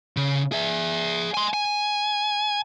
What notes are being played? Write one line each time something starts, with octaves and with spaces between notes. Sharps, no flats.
C#3
G#4 E5
G#5 C6
G#5